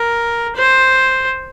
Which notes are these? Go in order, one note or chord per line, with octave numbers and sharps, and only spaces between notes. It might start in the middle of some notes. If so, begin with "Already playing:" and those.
Already playing: A#4
C5